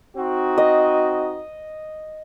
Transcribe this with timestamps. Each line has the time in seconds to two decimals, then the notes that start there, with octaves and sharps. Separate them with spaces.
0.16 C4 D#4 F#4
0.58 D#5